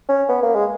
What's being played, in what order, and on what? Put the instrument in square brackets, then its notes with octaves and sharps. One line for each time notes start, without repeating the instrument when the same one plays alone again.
[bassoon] C#4
B3
A#3
G#3